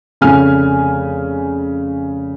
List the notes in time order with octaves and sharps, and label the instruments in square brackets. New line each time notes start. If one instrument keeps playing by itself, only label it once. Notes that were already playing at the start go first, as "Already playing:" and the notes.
[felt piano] F1 C#3 G#5 F6